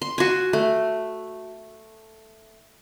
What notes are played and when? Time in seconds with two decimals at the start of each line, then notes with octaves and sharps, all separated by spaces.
0.02 C6
0.18 F#4 G#5
0.53 A3